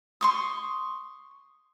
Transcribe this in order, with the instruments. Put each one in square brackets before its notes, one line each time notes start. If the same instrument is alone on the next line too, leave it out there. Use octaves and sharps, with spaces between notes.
[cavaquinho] C6 C#6 D#6